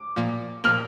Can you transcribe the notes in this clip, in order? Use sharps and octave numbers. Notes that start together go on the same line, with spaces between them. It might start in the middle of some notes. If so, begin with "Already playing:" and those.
Already playing: D6
A#2 F3 A#3
A#2 F3 A#3 F6